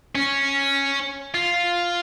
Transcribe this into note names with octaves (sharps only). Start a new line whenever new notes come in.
C#4
F4